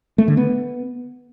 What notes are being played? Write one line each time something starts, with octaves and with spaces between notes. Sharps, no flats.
A3
D3
B3